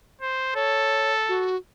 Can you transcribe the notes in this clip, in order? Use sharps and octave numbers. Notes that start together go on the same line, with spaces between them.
C5
A4 C#5
F#4